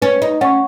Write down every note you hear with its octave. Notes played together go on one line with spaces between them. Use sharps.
C#4 B4
D#4
C#4 F#5 C#6